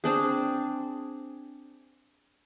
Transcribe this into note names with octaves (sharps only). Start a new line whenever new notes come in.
C4 D4 G#4